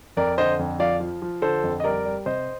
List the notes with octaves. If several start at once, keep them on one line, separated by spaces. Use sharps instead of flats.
F2 A#4 D5
D3 C5 D#5
F2
F3 D5 F5
F3
F3
D3 A4 C5
F2
D#5
G3 A#4 D5
G3
C3 C5 D#5